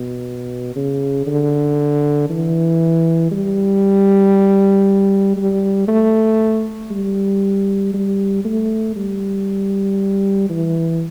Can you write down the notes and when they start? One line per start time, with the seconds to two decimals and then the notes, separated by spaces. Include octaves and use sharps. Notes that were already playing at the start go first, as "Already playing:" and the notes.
Already playing: B2
0.76 C#3
1.27 D3
2.30 E3
3.31 G3
5.37 G3
5.88 A3
6.91 G3
7.94 G3
8.45 A3
8.96 G3
10.49 E3